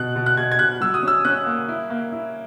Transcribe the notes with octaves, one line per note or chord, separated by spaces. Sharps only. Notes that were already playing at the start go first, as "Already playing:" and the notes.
Already playing: B2 F#6
B2
F#6
B2 G#6
G#6
B2 F#6
F#3 E6
D#6
C#4 E6
C#4 F#6
A#3
E4
A#3
E4